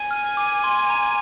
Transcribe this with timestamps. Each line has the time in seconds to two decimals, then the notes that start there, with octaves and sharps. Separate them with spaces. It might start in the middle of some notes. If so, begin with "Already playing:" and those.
Already playing: G#5
0.11 F6
0.37 D6
0.64 C6
0.90 A#5